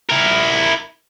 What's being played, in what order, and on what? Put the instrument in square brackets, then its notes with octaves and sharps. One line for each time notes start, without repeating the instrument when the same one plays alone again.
[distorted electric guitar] E4 A#4